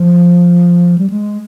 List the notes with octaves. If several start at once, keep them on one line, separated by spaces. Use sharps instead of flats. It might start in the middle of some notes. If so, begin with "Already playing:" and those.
Already playing: F3
G3
G#3